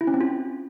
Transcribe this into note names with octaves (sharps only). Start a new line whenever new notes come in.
E4
C#4
C4
F4